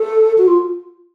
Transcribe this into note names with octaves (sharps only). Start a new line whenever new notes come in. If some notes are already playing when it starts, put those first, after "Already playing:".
Already playing: A4
F#4
F4